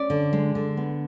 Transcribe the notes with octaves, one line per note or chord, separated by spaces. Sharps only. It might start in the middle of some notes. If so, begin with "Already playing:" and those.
Already playing: C#4 D5
D3
G#3
D3
B3